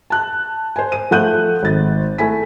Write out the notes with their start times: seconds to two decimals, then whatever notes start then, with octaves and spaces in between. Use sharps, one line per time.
0.10 A5 F#6
0.76 C5 G#5
0.92 D#7
1.11 F3 A3 F#5 F#6 G6 D#7
1.63 G#1 A6
2.18 A3 E4 G#5 B6